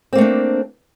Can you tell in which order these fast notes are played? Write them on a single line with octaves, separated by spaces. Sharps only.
C4 A#3 A3 D4